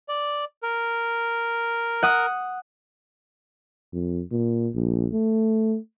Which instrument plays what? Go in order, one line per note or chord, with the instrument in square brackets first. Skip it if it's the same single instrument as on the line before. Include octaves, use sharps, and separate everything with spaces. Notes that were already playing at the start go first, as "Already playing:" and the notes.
[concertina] D5
A#4
[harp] F#5 D#6
[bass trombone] F2
A#2
A#1
A3